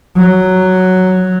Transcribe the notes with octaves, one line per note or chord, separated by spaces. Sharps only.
F#3